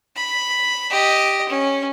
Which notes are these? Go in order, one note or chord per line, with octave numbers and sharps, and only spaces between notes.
B5
G4 D#5
C#4